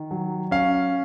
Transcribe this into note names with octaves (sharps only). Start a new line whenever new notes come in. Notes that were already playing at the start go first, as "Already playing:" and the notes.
Already playing: D#3
F#3
C#4 F5